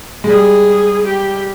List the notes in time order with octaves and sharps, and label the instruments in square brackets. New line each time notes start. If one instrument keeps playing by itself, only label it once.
[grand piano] G#3
[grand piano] G3 [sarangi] G#4
[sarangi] G4